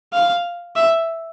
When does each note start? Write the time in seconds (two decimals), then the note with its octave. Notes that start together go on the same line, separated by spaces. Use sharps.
0.13 F5
0.76 E5